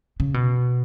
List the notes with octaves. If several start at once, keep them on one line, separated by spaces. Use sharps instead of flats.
C#3
B2